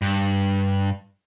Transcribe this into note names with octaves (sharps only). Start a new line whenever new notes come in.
G2